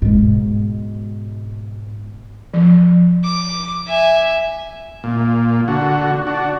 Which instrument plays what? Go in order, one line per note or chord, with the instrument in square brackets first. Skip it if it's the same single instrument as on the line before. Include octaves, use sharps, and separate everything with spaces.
[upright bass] G#2 B2
[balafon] F3
[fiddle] D6
E5 G#5
[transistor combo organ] A#2
D3 F#4
D4 F#4